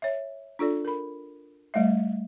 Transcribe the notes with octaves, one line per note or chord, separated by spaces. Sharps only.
C#5 E5
D4 F4 A4 D5
A#4 B5
G3 A3 D5 E5